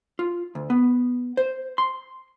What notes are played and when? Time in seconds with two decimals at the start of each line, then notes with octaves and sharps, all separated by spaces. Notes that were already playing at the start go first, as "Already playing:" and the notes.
0.19 F4
0.55 D2
0.70 B3
1.37 C5
1.78 C6